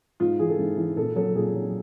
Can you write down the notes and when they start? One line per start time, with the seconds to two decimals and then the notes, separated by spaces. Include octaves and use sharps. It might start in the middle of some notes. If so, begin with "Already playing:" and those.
0.20 G#2 F4
0.39 E3 G#4
0.49 A4
0.59 G#2
0.77 E3
0.97 A#2 A4
1.15 F#3 A4
1.35 A#2 G#4
1.54 F#3